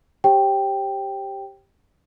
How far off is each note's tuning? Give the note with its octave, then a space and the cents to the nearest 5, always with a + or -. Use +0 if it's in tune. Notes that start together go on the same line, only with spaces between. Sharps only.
G4 +0 C5 +45 G5 +0